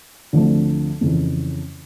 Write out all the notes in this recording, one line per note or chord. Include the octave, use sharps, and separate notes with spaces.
D2 D3 F3 A3 C4
F2 C#3 E3